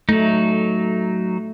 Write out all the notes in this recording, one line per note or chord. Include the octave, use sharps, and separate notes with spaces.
F#3 A3 D#4